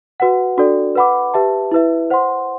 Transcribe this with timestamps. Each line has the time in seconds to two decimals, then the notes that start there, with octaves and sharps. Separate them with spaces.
0.20 F#4 B4 F#5
0.58 D4 F#4 A4 D5
0.96 B4 F#5 B5 D6
1.34 G4 B4 E5 A5
1.72 E4 B4 E5
2.10 C5 F#5 C6